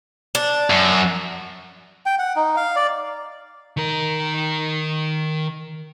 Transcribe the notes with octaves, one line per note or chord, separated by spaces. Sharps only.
D4
F#2
G5
F#5
D#4
F5
D5
D#3 A#4